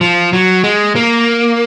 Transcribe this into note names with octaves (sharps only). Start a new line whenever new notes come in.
F3
F#3
G#3
A#3